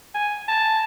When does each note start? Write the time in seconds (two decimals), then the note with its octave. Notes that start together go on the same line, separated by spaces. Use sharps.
0.14 G#5
0.48 A5